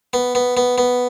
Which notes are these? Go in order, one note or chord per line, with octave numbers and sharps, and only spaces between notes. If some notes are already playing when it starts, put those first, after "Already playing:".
B3
B3
B3
B3